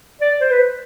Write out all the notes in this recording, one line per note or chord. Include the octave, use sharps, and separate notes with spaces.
D5
C5
B4